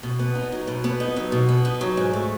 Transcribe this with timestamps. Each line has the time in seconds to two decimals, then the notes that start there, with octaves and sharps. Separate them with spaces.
0.03 B2
0.19 B3
0.35 D#4
0.52 F#3
0.67 B2
0.84 B3
1.00 D#4
1.16 F#3
1.32 B2
1.49 B3
1.65 D#4
1.81 F#3
1.97 G#2
2.13 A3